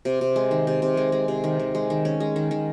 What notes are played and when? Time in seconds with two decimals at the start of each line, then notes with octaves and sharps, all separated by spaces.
0.05 C3
0.21 C3
0.36 G#3
0.51 D#3
0.67 C3
0.82 C3
0.97 G#3
1.12 G#3
1.28 C3
1.44 D#3
1.59 D#3
1.75 G#3
1.90 D#3
2.05 C#4
2.20 G#3
2.36 D#3
2.51 D#3